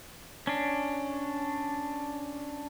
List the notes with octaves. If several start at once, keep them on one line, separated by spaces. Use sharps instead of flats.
C#4 D4